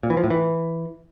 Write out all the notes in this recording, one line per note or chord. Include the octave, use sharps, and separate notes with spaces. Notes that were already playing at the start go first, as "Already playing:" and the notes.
A#2
E3
F3
A2
E3